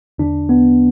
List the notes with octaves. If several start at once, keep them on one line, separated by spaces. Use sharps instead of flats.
E2 D3 D4
B3